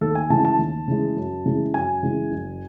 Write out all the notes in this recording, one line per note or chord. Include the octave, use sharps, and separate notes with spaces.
D#2 A4
G#5
C#3 E3 G#3 A5
A5
D#2
C#3 E3 G#3
F#2
C#3 E3 G#3
F#2 G#5
C#3 E3 G#3
F#1